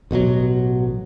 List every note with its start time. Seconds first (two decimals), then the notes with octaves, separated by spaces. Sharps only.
0.11 A1 B2 D#3 F#3